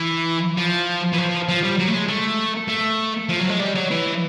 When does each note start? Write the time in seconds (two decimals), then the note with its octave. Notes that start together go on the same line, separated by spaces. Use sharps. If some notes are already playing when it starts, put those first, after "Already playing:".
Already playing: E3
0.57 F3
1.13 E3
1.18 F3
1.49 F3
1.63 G3
1.79 F#3
1.88 A3
1.94 G#3
2.08 A3
2.69 A3
3.29 F3
3.39 F#3
3.50 G#3
3.60 G3
3.75 F#3
3.91 E3